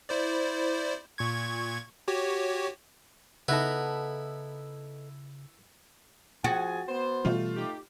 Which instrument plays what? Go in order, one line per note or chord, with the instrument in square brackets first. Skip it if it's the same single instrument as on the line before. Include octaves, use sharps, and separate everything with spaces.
[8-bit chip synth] E4 C5 D5
A#2 C#6 G#6
F#4 G4 C#5
[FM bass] C#3 [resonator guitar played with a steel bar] B3 D#4 A4 [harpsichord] E4
[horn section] F3 G#4 G#5 [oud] F#4 [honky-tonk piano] A6
[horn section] B3 C5
[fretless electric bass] B2 E3 G3 [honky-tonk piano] A3 F4
[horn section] D#4 G4